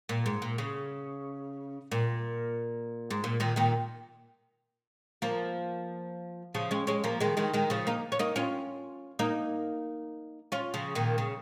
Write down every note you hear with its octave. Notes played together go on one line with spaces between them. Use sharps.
A#2
G#2
A#2
C#3
A#2
G#2
A#2
A#2 D#3
A#2 D#3
F3 A#3
C#3 F3
G#3 C#4
G#3 C#4
F3 A#3
D#3 G#3
D#3 G#3
D#3 G#3
C#3 F3
A#3 D#4
C#4
A#3 D#4
C#4 F4
A#3 D#4
C#4 F4
C#3 F3
A#2 D#3
C#3